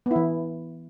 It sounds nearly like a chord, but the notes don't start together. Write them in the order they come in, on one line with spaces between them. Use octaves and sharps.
B3 E4 E3